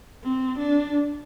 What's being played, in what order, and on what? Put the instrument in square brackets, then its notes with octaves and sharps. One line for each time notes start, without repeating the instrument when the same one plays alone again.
[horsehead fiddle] C4
D4